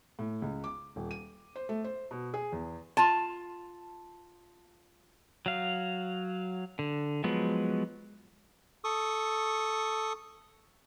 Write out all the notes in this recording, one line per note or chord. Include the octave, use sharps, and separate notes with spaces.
A2
C#2
D6
D#1
D#7
C5
A3
C5
B2
G#4
E2
F4 A5
F#3 F5
D3
F3 F#3 G#3 B3
A4 C#6 D#6